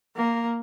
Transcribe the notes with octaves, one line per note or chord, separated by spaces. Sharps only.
A#3